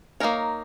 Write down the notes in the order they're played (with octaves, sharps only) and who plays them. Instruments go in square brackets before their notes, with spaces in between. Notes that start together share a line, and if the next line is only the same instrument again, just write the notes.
[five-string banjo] A#3 D#4 A#4 C#5